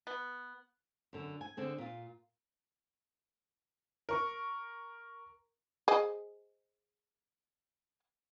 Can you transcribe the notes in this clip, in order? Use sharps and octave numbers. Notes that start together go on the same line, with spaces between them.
B3
F#2 D3
G#5
D3 C4 G#4
A#2 F4
A#4 C#6
G#4 C5 D#5